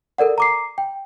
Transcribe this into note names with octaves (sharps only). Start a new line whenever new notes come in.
A4 A#4 D5 F#5
A#5 D6 C7
G5